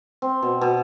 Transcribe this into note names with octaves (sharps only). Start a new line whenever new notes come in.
C4
B2
B2